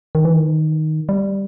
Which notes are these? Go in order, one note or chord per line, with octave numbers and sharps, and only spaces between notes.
D#3
E3
D#3
G3